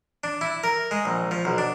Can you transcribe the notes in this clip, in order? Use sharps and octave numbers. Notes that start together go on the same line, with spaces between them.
D4
E4
A#4
G#3
A#1
F3
B1
D4